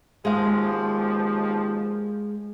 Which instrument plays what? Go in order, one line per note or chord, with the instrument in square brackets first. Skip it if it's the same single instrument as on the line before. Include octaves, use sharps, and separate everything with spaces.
[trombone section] D#2 B2 F3 [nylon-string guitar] G#3 F5